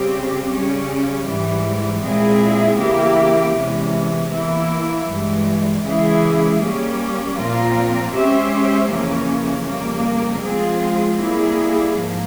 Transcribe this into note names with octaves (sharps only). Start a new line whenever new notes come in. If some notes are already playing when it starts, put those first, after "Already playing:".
Already playing: C#3 G3 C4 G4
C#3 G3 C#4
G#2 E3 G3
A#2 G#3 C4 E4 G#4
C#3 E3 A#3 E4 G4
E2 C3 E3 G#3 C#4
E3 A#3 E4
G2 E3 G#3
C#3 E3 G#3 E4 G#4
G3 A#3 C#4
A#2 F3 C4 F4 A#4
G#3 C#4 G4 C5 E5
F2 C#3 E3 A#3 C#4
F2 C#3 G3 A#3
F3 G#3 C4 F4 G#4
G3 A#3 E4 G#4
G#2 F3 A#3